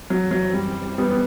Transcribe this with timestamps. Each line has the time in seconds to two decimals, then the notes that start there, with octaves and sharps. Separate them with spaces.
0.10 F#2 E3 F#3 G3 C4
0.31 F#3
0.54 G3
0.98 G3 B3
1.10 B3